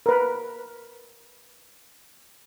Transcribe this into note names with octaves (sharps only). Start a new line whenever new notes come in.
A#4 B4